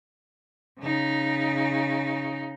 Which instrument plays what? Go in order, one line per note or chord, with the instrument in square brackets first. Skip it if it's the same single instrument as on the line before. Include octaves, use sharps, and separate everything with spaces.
[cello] C#3 D#4